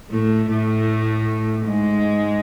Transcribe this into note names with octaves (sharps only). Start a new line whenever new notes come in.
A2 A3
A2 A3
G#2 G#3